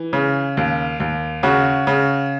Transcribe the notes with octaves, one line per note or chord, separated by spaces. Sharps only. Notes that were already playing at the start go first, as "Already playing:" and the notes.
Already playing: E3
C#3
D#2
D#2
C#3 F#4
C#3